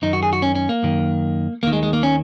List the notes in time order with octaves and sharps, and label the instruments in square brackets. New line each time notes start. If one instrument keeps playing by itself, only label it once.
[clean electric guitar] F#2 D#3 D#4
F#4
G#4
F#4
C#4
C#4
A#3
F#2 D#3
D#2 D#3 A#3
G#3
G#3
A#3
C#4